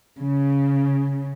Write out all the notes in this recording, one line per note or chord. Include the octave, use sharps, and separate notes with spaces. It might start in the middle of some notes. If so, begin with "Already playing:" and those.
C#3